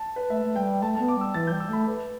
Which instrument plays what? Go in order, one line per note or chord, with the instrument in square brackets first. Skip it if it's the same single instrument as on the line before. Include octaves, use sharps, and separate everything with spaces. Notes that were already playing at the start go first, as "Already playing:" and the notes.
Already playing: [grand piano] A5
B4
[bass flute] A3 [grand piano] E5
[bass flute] A3
[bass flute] G3 [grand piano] G5
[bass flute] A3 [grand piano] A5
[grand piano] A5
[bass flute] B3
[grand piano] D6
[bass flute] G3 [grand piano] E6
[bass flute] E3 [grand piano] A6
[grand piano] G6
[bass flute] G3
[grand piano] E6
[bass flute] A3 [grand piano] B5
[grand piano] B4